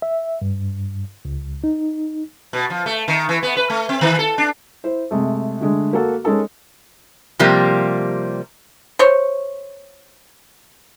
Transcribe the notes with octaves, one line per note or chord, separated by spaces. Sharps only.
E5
G2
C#2
D#4
B2
F3
A3
D#3
E3
B3
B4
A3
C4
D#3
A4
D4
E4 C5
C3 G#3 A3
D3 G#3 A3
A#3 F#4 A4
G#3 C#4 D#4 A4 A#4
C3 F3 G3 A#3 G4
C5 C#5